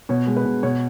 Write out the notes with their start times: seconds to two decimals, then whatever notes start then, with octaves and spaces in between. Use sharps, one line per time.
0.09 B2 C#5
0.27 G#3
0.36 B4
0.45 B2
0.63 B2 C#5